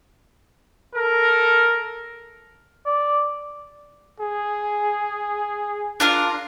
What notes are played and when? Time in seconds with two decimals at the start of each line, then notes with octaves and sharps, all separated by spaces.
0.96 A4 A#4
2.86 D5
4.20 G#4
6.00 D4 F4 A#4